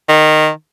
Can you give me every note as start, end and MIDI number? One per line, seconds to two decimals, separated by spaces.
0.09 0.49 51